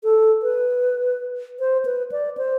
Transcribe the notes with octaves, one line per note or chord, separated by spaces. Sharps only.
A4
B4
C5
B4
D5
C5